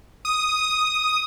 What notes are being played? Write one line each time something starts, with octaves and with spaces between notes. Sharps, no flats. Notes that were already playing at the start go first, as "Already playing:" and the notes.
D#6